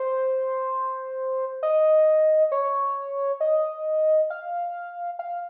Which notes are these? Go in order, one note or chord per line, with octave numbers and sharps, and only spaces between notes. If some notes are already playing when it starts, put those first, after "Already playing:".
Already playing: C5
D#5
C#5
D#5
F5
F5